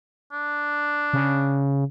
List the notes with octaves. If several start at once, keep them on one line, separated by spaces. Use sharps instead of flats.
D4
C#3